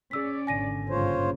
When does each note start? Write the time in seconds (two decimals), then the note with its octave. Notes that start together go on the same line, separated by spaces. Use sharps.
0.11 C#4 G#4 D5 E6 B6
0.47 G#1 B2 D3 G#5 A#6 D#7
0.89 G2 A#2 C#3 F4 C5 C#5